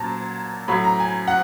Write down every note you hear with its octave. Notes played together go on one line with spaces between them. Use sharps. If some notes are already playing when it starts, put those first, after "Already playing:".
Already playing: A#2 F#3 A5 A#5
A2 F#3 B5
A#5
G#5
F#5